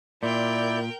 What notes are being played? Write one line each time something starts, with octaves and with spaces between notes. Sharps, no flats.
A#2 E4 A#4 D5 G5 G6